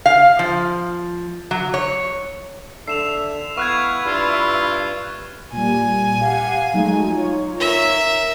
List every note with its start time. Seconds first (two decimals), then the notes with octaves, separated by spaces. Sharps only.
0.06 F5
0.39 F3
1.51 F#3
1.74 C#5
2.88 D3 E5 C7 E7 F7
3.57 B3 E4 F5 C#6 F#6 G#6
4.06 G2 F4
5.52 A#2 G3 G#5
6.21 G4 F5 F#5
6.74 F#3 G#3 A3 D#4
7.09 F4 C#5
7.60 A#4 E5